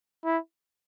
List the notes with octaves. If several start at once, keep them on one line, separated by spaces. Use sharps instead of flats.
E4